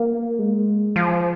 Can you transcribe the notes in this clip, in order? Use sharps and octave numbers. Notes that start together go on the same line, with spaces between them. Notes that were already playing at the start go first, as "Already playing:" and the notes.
Already playing: A#3
G#3
F3